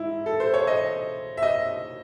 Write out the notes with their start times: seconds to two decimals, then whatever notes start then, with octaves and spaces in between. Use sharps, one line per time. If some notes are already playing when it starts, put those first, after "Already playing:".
Already playing: G#2 E4
0.26 A4
0.40 C5
0.54 C#5
0.67 D#5
1.37 E5
1.43 D#5